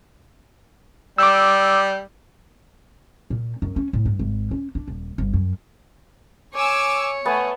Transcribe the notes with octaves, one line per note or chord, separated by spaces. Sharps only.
G3 D6 E6
A#2
F#2
C#4
A2
G2
G#1
C#4
D4
D#1
G1
F#2
C#5 G#5 D6 E6
A3 B3 G#5